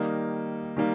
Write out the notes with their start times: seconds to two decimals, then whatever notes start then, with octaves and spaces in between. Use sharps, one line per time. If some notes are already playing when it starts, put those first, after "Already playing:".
Already playing: D#3 G3 A#3 D#4
0.77 D#3 G3 A#3